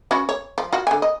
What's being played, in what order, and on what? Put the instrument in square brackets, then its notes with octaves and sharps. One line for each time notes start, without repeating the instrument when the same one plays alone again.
[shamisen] C#4 F#4 B4
C#5
F3
F4 F#4
D3 G#5
D#5